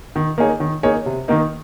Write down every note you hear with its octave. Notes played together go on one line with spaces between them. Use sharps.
D#3
A#3 D#4 G#4 C#5
D#3
A#3 D#4 G#4 C#5
C3
D#3 A#3 D#4